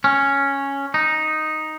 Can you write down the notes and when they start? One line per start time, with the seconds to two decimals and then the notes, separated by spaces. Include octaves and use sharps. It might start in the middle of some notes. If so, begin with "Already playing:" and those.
0.04 C#4
0.94 D#4